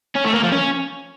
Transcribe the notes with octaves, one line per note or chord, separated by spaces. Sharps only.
C#4
A3
A#3
F3
C#4